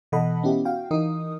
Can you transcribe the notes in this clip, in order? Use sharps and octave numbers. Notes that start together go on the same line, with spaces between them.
B2 E3 A4 D#5 F#5 B5
B3 C#4 E4 G4
F#4 F5 G5
E3 D#4 A#4 D#6